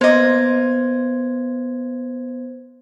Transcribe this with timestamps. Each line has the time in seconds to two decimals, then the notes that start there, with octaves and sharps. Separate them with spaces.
0.01 A#3 B3 C5 D#5 G#6